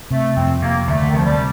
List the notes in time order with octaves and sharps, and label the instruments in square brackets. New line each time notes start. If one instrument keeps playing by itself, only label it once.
[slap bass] C3 [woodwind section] A3
[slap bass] F2 [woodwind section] C4
[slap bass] C3 [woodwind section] A#3
[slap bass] D2 [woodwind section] A3
[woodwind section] D3
D#3
[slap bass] C3 [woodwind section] F3
[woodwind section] G3